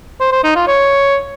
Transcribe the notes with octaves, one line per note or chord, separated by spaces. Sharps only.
C5
C5
D#4
F4
C#5